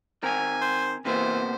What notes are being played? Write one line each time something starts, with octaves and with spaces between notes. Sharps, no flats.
D#3 C4 A#4 G#5
C5
C3 E3 A#3 B3 C5